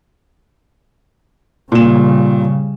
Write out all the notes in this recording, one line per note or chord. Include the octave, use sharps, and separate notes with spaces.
A#2 C#3 G3 E7